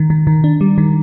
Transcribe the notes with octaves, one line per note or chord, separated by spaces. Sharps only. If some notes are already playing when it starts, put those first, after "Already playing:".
Already playing: D#3
D#3
D#3
D4
G3
D#3